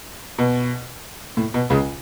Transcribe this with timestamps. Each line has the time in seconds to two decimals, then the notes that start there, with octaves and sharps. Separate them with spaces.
0.38 B2
1.37 A2
1.54 B2
1.70 C#2 C#3